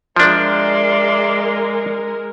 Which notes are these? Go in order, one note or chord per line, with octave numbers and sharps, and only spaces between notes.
F3 G#3 D4 A#4 D5 E5 C6